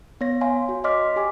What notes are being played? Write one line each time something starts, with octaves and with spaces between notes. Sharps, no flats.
B3 C#5 A#6
C#5 F5 G#5 C6
F#4
C#5 D#5 C6 D6 F6 B6
G4 G#5 D6